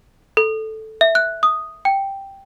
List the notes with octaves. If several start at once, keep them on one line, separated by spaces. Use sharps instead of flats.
A4
E5
F#6
D#6
G5